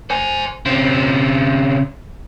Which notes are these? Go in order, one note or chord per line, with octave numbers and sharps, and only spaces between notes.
C5 G#5
C#3 C4